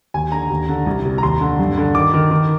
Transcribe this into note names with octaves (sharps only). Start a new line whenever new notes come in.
D#2 G#5
D3 A#5
D#2
D3
C2
C3
A#5
D#2 C6
D3
G2
D3
D#3 D6
D#3
D#3